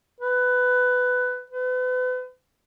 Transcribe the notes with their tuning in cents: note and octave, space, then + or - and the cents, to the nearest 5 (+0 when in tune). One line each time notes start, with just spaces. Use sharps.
B4 +15
B4 +40